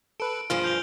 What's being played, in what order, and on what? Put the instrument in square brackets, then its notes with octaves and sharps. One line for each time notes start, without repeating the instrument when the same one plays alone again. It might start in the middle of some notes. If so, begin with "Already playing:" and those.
[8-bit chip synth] A4 B4 [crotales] D7
[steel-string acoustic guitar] G2 F3 G#4 [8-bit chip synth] F4 [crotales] F6 D7
[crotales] G6 F7 G7